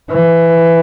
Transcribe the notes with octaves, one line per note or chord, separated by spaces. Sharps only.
E3